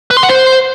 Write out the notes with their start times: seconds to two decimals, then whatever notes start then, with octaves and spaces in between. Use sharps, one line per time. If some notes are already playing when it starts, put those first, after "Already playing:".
0.11 B4
0.17 C6
0.23 F#5
0.29 C5